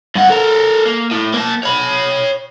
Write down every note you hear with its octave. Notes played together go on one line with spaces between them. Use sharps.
G2 F#5
A4 A#4
A#3
A2
A#3 A5
C#5 B5